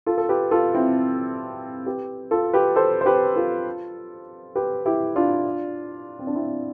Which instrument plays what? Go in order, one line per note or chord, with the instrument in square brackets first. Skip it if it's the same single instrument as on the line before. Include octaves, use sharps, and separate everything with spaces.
[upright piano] F4 A4
A4
G4 B4
F4 A4
C4 E4
G4 B4
F4 A4
G4 B4
A4 C5
C5
G4 B4
F4 A4
G4 B4
E4 G4
D4 F4
C4
D4
C4 E4